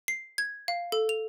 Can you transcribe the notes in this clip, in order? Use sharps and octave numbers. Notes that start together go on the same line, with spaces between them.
C7
G#6
F5
A4
F7